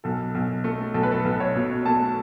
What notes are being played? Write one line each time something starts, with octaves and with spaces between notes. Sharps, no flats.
B1 A4
B1
A3
B1 A4
B4
A4
B1
C#5
B2
A3 A5